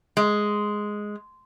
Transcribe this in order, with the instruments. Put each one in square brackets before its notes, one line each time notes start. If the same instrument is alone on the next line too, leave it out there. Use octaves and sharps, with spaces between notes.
[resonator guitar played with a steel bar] G#3